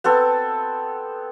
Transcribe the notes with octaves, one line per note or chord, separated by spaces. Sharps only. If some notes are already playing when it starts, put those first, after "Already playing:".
B3 C4 A4